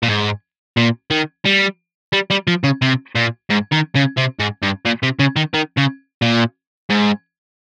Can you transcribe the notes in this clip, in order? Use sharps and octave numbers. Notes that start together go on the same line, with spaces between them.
A#2
G#2
A#2
D#3
G3
G3
G3
F3
C#3
C3
A#2
G#2
D#3
C#3
C3
G#2
G2
A#2
C3
C#3
D#3
D#3
C#3
A#2
G#2